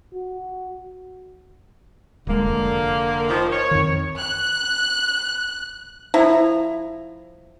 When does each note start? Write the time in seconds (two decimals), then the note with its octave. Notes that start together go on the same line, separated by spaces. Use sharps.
0.14 F#4
2.27 D#1 D3 G#3 A#3
2.46 F1
3.29 D#3 F3
3.51 C#5
3.71 F2 D#3
4.20 F#6
6.14 F3 E4 A#5